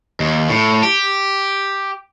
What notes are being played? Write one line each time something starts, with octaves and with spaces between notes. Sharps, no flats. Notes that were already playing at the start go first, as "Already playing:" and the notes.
D#2
A2
G4